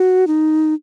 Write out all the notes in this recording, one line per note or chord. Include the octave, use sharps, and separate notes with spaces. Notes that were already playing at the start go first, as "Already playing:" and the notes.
Already playing: F#4
D#4